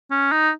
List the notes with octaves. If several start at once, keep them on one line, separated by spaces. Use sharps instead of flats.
C#4
D#4